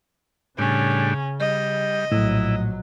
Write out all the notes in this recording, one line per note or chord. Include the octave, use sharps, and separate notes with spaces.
A2 C#3 G3 C#4 D4
G3 D#5
A#1 A2 F#3 E4